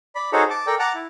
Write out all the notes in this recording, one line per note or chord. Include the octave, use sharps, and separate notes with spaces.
D5 B5
D#4 F#4 G#4 A4 C5 C#5
A5 D6
A4 A#4 D5 G5
F#5 A5 A#5 D6
E4